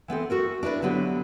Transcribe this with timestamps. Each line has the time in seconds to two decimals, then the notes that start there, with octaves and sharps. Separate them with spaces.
0.08 E3 B3 C4 A4
0.30 F#4 A4 A#4
0.63 D4 E4 B4 D5
0.82 D3 F#3 B3 G4